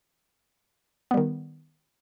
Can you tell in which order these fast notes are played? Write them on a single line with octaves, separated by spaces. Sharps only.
B3 G3 D#3